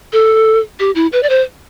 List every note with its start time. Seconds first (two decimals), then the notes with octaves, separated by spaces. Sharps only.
0.13 A4
0.80 G4
0.95 E4
1.13 B4
1.23 D5
1.30 C5